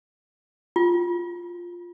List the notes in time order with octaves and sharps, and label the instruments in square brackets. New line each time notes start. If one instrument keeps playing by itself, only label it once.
[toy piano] F4